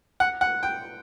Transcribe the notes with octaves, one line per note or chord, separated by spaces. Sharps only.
F#5
F#5
G5